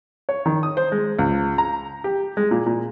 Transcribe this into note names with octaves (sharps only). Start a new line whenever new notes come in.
C#5
D#3
D#6
C5
G#3
C#2
A#5
G4
G#3
A#2
A#2